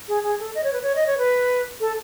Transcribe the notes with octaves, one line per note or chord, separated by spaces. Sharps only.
G#4
G#4
A4
D#5
C#5
B4
C#5
D#5
C#5
B4
A4